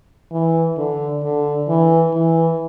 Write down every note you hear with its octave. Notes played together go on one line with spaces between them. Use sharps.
E3
D3
D3
E3
E3